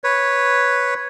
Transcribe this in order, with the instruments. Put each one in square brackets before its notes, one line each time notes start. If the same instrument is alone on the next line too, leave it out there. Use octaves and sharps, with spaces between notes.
[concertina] B4 C#5